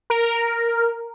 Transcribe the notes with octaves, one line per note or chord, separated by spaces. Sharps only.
A#4